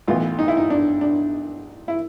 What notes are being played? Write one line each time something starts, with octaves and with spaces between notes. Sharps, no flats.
B1 A2 E3 F4
D#4
E4
D#4
D4
D4
E4